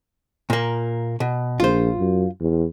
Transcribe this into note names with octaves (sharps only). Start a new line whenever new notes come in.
A#2 A#3
B2
A#1 F4 C5
F#2
E2